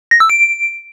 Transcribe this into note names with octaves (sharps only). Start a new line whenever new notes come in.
A#6
E6
D7